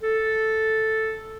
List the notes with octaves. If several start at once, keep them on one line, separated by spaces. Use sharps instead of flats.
A4